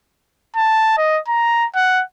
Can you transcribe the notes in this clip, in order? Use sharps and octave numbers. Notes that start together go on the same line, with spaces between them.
A5
D#5
A#5
F#5